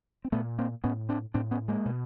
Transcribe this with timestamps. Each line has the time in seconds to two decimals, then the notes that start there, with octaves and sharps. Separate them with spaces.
0.25 C4
0.32 A#2 A3 B3
0.58 A#3 C4
0.84 A2 B3 C#4
1.09 C4 D4
1.34 A2 C4 D4
1.51 B3 C#4
1.68 G#3 A#3
1.85 B2